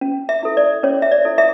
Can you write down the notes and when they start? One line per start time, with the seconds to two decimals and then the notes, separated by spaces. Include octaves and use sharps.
0.01 C#4
0.29 E5
0.43 E4 A4
0.57 D5
0.83 C#4 C#5
1.02 E5
1.12 D5
1.25 E4 A4
1.38 E5